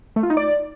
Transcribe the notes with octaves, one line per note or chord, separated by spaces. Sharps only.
A3
F4
D#4
D5